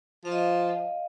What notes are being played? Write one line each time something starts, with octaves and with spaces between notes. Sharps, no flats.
F3 F5
D#5
F5